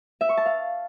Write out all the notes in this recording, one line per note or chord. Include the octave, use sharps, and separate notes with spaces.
E5
C#6
A5
F5